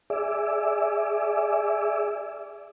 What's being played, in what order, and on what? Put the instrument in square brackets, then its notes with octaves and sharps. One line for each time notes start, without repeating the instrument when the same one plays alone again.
[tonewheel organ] G#4 D5 E5